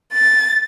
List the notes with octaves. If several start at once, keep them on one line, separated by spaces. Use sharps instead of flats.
A6